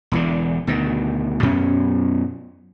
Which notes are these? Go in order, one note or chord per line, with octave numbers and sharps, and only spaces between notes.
E1 E2 D3
D2 B2 D#3
F#2 B2 C#4